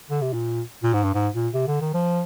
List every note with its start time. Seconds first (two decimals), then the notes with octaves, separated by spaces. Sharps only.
0.10 D3
0.22 C3
0.33 A#2
0.83 A#2
0.93 G#2
1.03 G2
1.14 G#2
1.34 A#2
1.54 C3
1.67 D3
1.81 D#3
1.94 F3